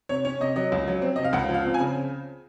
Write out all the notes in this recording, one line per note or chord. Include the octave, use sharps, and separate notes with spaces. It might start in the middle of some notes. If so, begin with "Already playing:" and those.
C3 C#5
C#4 C#5
C3 D#5
F#3 D#5
C#2
F#3
C4
C3 D#5
F5
C#2 F#5
F3
F5
C4
G#5
C#3